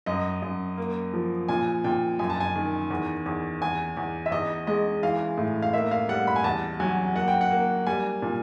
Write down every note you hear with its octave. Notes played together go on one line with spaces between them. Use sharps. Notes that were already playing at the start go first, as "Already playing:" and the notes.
F#2 D#5
F#2
A#3
F3
A#2 G#5
A#2 G5
F#2 G#5
A5
G#5
D#3
E2
E2
E2 G#5
E2
E5
E2 D#5
G#3 D#5
E3 F5
A2
F5
A#3 E5
F5
G3 F#5
B5
G#5
E2 A5
F#3 G#5
A#3 F#5
G5
F#5
A#3
G3 G#5
A#2